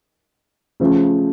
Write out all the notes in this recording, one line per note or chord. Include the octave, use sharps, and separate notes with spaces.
C#3 F3 A3